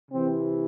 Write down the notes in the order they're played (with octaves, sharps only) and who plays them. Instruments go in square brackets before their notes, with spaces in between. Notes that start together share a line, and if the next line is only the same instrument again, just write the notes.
[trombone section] C3 E3 C4